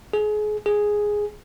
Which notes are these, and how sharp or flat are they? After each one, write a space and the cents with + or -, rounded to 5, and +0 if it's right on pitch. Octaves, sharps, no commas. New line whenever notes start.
G#4 +30
G#4 +0